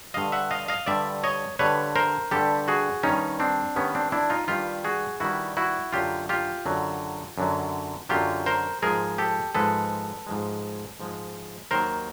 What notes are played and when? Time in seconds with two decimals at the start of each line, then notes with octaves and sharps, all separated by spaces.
0.14 G2 D3 G3 D#5 F5
0.32 E5 F#5
0.51 D#5 F5
0.68 D#5 F5
0.86 G2 D3 G3 D5 E5
1.24 C#5 D#5
1.59 G2 D3 G3 B4 C#5
1.96 A#4 C5
2.31 G2 D3 G3 G4 A4
2.68 F#4 G#4
3.03 G2 D#3 G3 C#4 D#4
3.40 C4 D4
3.76 G2 D#3 G3 B3 C#4
3.95 C4 D4
4.12 D4 E4
4.30 D#4 F4
4.48 G2 D#3 G3 F4 G4
4.84 F#4 G#4
5.20 G2 D#3 G3 E4 F#4
5.57 E4 F#4
5.93 F#2 D3 F#3 F4 G4
6.29 F4 G4
6.66 F#2 D3 F#3
7.38 F#2 D3 F#3
8.09 F#2 D3 F#3 F4 G4
8.46 A#4 C5
8.82 G#2 F3 G#3 G#4 A#4
9.18 G4 A4
9.55 G#2 F3 G#3 A4 B4
10.27 G#2 F3 G#3
11.00 G#2 F3 G#3
11.71 D#2 D#3 F#3 A#4 C5